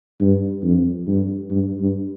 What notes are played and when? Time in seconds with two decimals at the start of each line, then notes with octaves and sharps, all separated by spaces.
0.21 G2
0.63 F2
1.07 G2
1.50 G2
1.80 G2